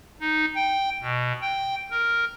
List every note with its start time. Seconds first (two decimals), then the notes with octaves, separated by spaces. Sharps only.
0.21 D#4
0.55 G5
1.01 B2
1.41 G5
1.91 A#4